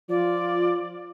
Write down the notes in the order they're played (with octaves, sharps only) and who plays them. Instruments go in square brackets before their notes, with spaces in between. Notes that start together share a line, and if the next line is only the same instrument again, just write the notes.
[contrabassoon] F3 [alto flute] F4 [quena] D5